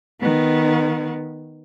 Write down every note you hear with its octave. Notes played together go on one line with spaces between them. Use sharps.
D#3 B3